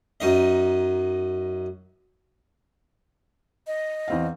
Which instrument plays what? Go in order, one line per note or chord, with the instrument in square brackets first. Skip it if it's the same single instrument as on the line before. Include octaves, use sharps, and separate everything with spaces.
[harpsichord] F#2 D#4 D#5
[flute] D#5
[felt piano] E2 C4 F5